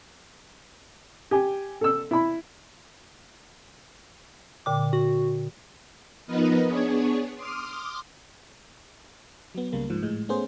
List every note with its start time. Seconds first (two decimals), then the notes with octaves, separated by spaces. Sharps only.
1.31 G4 G#5
1.81 A4 E6
2.11 E4 B5
4.66 A#2 D3 G5 D6
4.93 F#4
6.27 F3 B3 D#4 A#4 B4 D#5
6.68 B3 D4 G#4 C#5
7.35 C6 D6 D#6 F6
9.55 F#3 B3
9.72 C#2 C#3 G3 A#3
9.90 G#2 F3
10.03 A2 G#3
10.29 A3 B3 C#4 G#4 C5